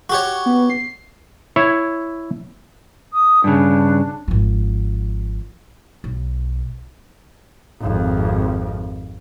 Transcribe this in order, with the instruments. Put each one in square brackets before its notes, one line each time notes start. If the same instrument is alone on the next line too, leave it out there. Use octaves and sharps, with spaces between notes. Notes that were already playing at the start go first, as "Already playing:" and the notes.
[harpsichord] F#4 G4 C#5
[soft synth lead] B3
C7
[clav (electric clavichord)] E4 C#5
[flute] D#6
[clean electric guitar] G2 C#3 [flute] D4
[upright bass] G#1 F3
B1
[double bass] G#1 F2